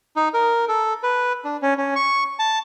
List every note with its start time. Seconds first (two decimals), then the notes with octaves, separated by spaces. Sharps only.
0.16 D#4
0.34 A#4
0.68 A4
1.03 B4
1.45 D4
1.62 C#4
1.78 C#4
1.95 C#6
2.39 A5